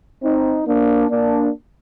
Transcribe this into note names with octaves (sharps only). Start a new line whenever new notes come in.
C4 D#4
A#3 D4
A#3 D4